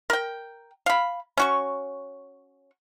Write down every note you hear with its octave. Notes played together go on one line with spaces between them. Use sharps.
A#4 G5
F5 B5
C#4 F#4 C#6